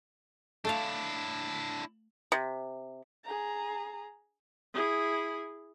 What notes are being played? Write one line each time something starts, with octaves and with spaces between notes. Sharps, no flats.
A3 D4 E4 A4 F5
C3
G#4 A#5
E4 G#4